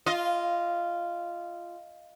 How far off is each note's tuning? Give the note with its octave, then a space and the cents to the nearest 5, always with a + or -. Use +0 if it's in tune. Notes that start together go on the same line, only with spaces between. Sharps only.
F4 -10 D#5 +0